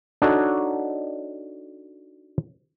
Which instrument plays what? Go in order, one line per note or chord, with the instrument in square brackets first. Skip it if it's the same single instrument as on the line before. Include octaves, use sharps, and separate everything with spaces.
[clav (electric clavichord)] D4 D#4 F#4 A4 C#5 D#5